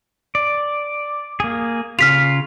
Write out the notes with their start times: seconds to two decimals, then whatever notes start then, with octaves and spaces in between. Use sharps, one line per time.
0.35 D5
1.40 A#3 G#4
1.99 C#3 F4 F6 B6 F7